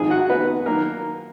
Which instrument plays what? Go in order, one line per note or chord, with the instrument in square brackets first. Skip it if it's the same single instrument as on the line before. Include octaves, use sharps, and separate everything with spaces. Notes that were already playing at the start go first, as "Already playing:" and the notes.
Already playing: [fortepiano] G#1 G#2 F3 G#3 G#4 G#5
F#4 F#5
B3 B4
D#3 F#3 A#3 A#4